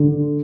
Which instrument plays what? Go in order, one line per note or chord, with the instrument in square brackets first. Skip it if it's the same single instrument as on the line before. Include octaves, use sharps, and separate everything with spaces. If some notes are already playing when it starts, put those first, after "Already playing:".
Already playing: [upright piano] D3